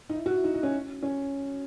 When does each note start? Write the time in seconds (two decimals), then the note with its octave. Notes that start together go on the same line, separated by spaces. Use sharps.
0.09 D#4
0.15 E4
0.26 F#4
0.34 E4
0.44 D#4
0.54 D#4
0.63 C#4
1.03 C#4